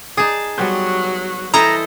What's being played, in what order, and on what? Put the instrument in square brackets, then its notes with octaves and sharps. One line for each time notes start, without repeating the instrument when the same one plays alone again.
[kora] D#4 D5 [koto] G#4 A5
[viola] F#3 F#4 [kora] G3 B3 C5
[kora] E3 D#4 [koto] E4 A4 D#5 [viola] C5 [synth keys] A#5